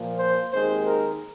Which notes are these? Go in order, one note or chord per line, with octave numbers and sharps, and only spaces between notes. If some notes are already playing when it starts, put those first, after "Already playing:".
Already playing: A#2 F3 A#3
C5
D#2 D#3 G#3 C4 C5
A#4